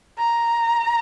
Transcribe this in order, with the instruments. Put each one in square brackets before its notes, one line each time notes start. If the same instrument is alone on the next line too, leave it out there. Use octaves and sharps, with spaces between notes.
[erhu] A#5